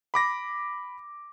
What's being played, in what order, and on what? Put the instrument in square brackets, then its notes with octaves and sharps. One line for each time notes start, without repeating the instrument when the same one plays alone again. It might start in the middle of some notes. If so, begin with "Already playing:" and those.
[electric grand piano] B5 D6 A#6